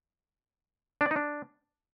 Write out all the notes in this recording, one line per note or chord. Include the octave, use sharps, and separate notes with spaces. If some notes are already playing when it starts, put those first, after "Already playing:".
D4
D5
D#4
D4